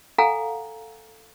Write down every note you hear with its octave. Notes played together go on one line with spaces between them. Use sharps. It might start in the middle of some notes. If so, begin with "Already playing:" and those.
A4 F5 F#5 G#5 A#5